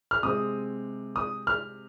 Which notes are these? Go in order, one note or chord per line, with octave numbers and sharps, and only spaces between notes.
F6
C3 G#3 C4 D#6
D#6
F6